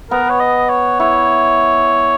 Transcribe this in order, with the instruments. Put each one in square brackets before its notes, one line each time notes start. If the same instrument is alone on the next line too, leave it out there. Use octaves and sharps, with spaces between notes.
[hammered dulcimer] B3 [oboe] A#4
[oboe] C#5
D#5
C#5
[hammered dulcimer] E4 [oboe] C#5